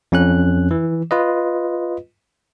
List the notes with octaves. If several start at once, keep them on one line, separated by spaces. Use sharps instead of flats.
F2 C#4 F#6
E3
F4 B4 D#5